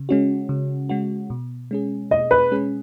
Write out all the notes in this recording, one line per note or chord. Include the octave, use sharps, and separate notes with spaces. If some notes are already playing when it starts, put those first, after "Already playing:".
Already playing: C#3
G#3 C#4 F#4
C#3
G#3 C#4 F#4
B2
G#3 C#4 G#4
B2 D#5
B4
G#3 C#4 G#4